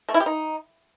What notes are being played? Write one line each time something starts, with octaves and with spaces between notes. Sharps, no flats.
A3
E4
G4
D#4